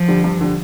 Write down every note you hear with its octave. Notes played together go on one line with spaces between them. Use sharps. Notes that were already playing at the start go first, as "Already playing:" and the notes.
Already playing: F3
D3 G3
G2
D3 G3